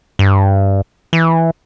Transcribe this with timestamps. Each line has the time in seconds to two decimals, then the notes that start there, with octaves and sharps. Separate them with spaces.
0.19 G2
1.13 E3